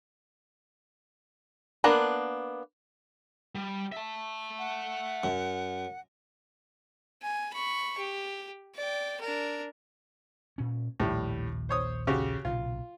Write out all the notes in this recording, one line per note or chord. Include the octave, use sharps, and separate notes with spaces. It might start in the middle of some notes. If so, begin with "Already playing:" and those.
A#3 B3 D4 A#5
G3
E5 A5
F#5
F#2
G#5
B5 C#6
G4
D5 G5
D4 A#4
A#2 C#4
A#1 D#2 A2 G3
C5 C#5 D#6
C#3 F#4 G4
B1 A#2 C#3 F4